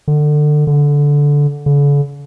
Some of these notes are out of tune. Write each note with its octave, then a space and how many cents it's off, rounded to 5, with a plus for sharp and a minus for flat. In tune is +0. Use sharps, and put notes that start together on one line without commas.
D3 +25
D3 -15
D3 -45